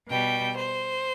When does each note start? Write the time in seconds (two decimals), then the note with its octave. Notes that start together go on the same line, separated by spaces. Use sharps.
0.09 B2 G3 G5
0.56 C5